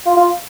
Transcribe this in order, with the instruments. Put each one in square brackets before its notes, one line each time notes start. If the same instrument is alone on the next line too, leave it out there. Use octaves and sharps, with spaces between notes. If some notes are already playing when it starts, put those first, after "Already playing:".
[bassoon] F4
F4